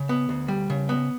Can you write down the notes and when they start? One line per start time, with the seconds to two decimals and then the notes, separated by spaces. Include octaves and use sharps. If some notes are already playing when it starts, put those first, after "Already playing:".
Already playing: C#3
0.09 B3
0.29 D2
0.48 G3
0.70 C#3
0.89 B3